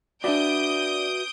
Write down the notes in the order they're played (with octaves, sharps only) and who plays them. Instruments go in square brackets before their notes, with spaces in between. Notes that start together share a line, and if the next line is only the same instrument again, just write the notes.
[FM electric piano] D4 D5 [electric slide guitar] F#4 B4 E5 [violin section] D#6 G6 D7